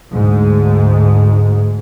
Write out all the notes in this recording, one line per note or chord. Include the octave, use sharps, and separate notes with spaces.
D2 G#2 G#3